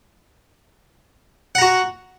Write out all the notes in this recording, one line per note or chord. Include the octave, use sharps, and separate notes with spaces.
F#4 F#5 A#5